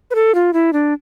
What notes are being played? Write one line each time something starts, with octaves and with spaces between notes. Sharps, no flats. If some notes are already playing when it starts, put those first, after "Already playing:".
B4
A4
F4
E4
D4